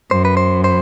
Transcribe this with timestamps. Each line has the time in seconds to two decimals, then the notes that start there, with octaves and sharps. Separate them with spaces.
0.11 F#2 C5
0.25 B4
0.37 C5
0.64 C5